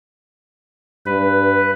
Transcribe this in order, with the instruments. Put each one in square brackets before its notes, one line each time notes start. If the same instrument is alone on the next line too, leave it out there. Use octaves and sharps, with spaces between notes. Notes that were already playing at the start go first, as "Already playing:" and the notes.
[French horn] G2 [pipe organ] B4